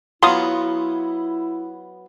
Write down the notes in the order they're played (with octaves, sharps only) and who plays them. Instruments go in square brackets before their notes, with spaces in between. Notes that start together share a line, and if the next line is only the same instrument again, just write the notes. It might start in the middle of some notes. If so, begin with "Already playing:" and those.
[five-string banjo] F#3 B3 F4 [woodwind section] E4 [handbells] C6 D#6